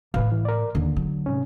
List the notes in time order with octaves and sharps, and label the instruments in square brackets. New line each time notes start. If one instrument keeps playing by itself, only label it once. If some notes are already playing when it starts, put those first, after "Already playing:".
[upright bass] A2 A3 [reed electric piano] B4 F5
[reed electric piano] E3
A#4 D5
[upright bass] D#2 [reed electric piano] D3
[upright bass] F#3
[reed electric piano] G#2 C3 C#4